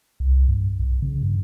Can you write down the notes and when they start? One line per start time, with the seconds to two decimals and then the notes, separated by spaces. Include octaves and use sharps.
0.20 C2
0.48 G2
0.80 B1
1.02 C#3
1.23 G2